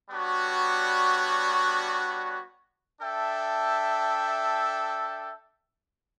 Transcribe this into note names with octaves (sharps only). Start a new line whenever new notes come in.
G3 B3 D4 F#4 C#5
D4 A4 E5 G5